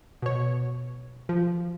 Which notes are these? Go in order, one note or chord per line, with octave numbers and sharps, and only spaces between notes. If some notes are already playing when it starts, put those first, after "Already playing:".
B2 C#5
F3